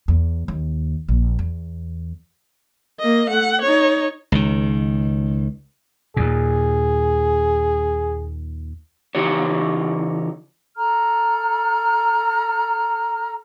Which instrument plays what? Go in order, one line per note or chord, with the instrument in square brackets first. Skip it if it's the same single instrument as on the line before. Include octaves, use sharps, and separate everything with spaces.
[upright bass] E2
D#2
A#1
E2
[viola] A#3 D#5
A3 F#5
D#4 C#5
[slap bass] C#2 D#3
[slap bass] D#2 A#2 [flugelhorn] G#4
[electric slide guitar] C#3 E3 D#4 G4 C#5
[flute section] A4 A#5 F6